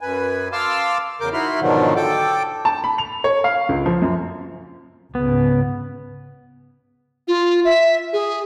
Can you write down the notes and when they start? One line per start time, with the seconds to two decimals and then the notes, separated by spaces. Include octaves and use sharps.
0.01 F#2 B4 G#5
0.53 F5 A5 C6 D6 E6 F6
1.21 E2 C#3 A#4 D6 G6
1.33 D#4 E4 F#4 B5 C6 F6
1.60 G#2 B2 D3 D#3 F3 F#3
1.96 A4 G5 D6
2.65 A5
2.84 B5
2.98 F7
3.24 C#5
3.44 F5
3.69 C#2
3.86 F3
4.02 F#2
5.15 C#2 G#2 C#3 B3
7.28 F4
7.65 E5
8.13 G#4